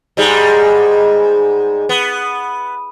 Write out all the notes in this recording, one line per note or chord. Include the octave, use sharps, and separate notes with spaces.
G#2 G3 G#3
B3